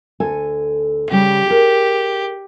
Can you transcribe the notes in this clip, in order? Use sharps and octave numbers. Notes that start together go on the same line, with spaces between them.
D2 A4 G#5
C#3 G3 G4
G#4 A#4